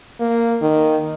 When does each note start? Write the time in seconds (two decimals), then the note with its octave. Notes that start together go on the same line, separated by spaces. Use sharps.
0.20 A#3
0.62 D#3